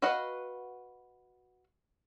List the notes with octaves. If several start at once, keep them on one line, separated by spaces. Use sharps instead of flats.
F#4 B4 D#5 F5 F#5